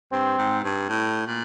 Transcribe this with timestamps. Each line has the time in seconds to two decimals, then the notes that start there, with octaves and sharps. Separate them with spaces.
0.12 G2 C4
0.38 G#2
0.64 G2
0.89 A2
1.27 A#2